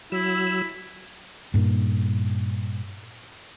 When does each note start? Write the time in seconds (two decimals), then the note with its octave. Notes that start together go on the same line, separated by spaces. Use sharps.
0.12 F#3 E4 E6
1.54 G2 A#2